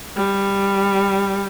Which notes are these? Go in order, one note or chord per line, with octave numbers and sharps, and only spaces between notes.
G3